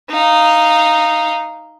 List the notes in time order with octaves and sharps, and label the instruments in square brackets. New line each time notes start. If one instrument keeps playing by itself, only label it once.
[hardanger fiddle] D#4 F5